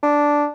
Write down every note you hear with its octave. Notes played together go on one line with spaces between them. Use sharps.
D4